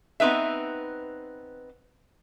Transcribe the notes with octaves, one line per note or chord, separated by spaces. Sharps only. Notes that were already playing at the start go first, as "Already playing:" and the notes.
B3 C4 D#4 B4 E5